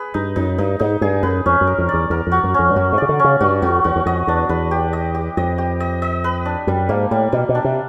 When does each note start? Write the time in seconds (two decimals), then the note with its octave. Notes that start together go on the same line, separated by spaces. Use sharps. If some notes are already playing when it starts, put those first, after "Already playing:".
Already playing: G#4 B4
0.14 G2 D#4
0.36 F#2 D#4
0.58 G2 D#4
0.79 G#2 D#4
1.01 G2 G#4
1.23 F#2 B4
1.46 F2 C#4
1.61 F#2
1.67 A#4
1.78 F2
1.89 E2 D5
2.10 E2 A#4
2.27 F2 F#4
2.44 F#2
2.54 F2 C#4
2.70 G2
2.76 F#2 F#4
2.93 G#2
2.98 C#3 D5
3.09 D3
3.19 C#4
3.24 C#3
3.41 G2 F#4
3.62 F2 F#4
3.84 E2 F#4
3.96 E2
4.06 F2 D#5
4.27 E2 D4
4.49 E2 B4
4.71 G4
4.93 D#5
5.15 G4
5.37 F2 D#5
5.58 G4
5.80 D#5
6.02 D#5
6.24 B4
6.45 D4
6.67 F#2 G3
6.89 G#2 A#3
7.11 A2 G3
7.32 B2 G3
7.49 B2
7.55 D4
7.65 C3